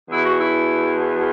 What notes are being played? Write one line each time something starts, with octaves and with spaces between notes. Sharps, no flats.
E2 B2 E4
F#4
E4